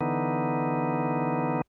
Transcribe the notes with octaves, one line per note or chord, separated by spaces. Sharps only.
D3 E3 B3 D#4